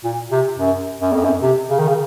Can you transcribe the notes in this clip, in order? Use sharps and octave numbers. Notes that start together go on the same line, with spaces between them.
A#2
C3
F#2
F#2
F2
F#2
C3
C#3
D#3
C#3